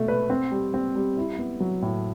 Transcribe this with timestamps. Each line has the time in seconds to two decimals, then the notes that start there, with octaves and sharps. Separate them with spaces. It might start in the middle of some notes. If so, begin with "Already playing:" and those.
Already playing: B2 A3
0.08 B4
0.30 C4
0.52 G3
0.74 C4
0.96 G3
1.17 E4
1.39 B3
1.60 F#3
1.82 A2